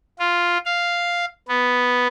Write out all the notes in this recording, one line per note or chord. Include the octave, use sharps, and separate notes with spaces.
F4
F5
B3